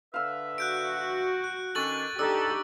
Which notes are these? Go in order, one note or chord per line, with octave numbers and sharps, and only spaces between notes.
D3 B4 E5 F5 E6
F#4 F#6 G6 D7
F#6
D#3 C#4 D4 A4 C#6 A6 F#7
D4 D#4 G4 A4 D5 E6